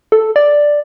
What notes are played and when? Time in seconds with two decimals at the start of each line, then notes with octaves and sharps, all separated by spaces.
0.12 A4
0.36 D5